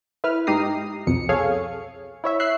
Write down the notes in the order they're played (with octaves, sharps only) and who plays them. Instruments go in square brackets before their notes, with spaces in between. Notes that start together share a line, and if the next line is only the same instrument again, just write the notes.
[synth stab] E4 B4 F6
G#2 D#4 G4 A#5 D#6 C7
C2 F2 B2 C#7
G#4 A4 C#5 F5 G#5
E4 C#5 E5
E5 F#6 C7